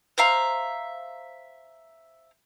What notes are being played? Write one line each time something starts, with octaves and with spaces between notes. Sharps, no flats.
C5 E5 F5 A#5